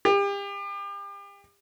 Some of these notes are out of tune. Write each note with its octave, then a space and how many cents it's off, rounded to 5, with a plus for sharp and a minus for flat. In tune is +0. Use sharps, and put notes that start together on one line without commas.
G4 +35